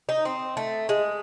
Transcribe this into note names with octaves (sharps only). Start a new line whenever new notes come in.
D#4
C4
A3
G#3